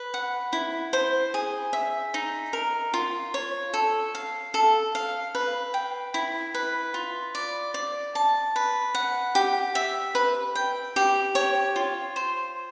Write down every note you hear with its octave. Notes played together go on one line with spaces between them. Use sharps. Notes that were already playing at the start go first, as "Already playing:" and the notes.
Already playing: B4
F#5
E4
C5
G#4
E5
D#4
A#4
F4
C#5
A4
F5
A4
F5
B4
G5
E4
B4
F4
D5
D5
A5
B4
F#5
G4
E5
B4
G5
G4
C#5
F4
C5